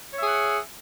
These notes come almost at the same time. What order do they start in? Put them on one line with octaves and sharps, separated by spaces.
C#5 E5 G#4 F#5